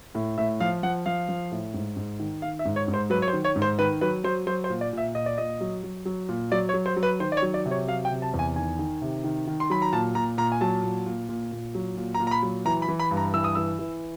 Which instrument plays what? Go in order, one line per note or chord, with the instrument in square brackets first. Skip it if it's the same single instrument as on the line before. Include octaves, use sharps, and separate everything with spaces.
[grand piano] A2
A2 E5
F3 F5
F3 F#5
F3 F5
F3
A2
G#2
G#2
D#3
D#3 F5
E5
G#2
C#5
G#2
C5
F#3 B4
C#5
C5
D#3
C#5
G#2
C5
D#3 B4
F#3 B4
F#3 C5
F#3 C5
C5
A#2
D5
A#2 E5
A#2 D#5
D5
A#2 D#5
F#3
F#3
F#3
A#2
F#3 D5
C#5
F#3
C5
F#3
B4
D#3 C5
D5
C#5
F#3
D5
C3
C#5
F#3 F5
G5
C3
A5
E2
G#5
D#3 G#5
D#3
C3
D#3
D#3
C6
F#3 B5
A#5
A#2 A5
A#2 A#5
A#2 A#5
G#5
F#3 A5
A#2
A#2
A#2
A#2
F#3
A#2
A#5
A#2
A#5
B5
F#3
E3 A#5
B5
E3
B5
G2
A#5
E3 E6
D#6
E3 E6
E3